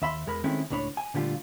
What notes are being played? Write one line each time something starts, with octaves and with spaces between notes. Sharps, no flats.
D#2 E5 B5 C6
E2 G#3 A#4 B5
D#3 G#3 A3 C4 C#4 E4
C#2 A2 D4 C#5 B5
G#5
A#2 D3 G3 A3 F4